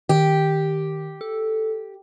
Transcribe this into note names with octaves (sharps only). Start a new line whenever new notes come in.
D#3 G4
A4